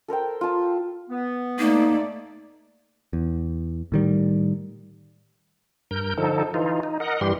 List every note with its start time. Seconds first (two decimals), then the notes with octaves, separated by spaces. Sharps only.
0.08 A4 A#4 C5 G5
0.41 F4 A5
1.10 B3
1.59 A3 A#3 D#4 D5
3.13 E2
3.92 A2 D#3 G3
5.91 G2 A#4 G6
6.17 D3 F3 D#4 A4
6.54 E3 D#4 F4
6.83 D#4
7.00 A#4 D#5 F#5
7.21 G2 E3 G3 G4 C6